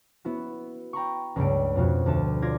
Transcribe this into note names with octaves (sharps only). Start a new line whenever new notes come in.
B3 E4 F#4
G5 A#5 B5 C#6
C#2 G2 C#3 G3 A3 D7
F2 B2 F4 F#4
D2 F#4 A5
F4 D5 G#6 A#6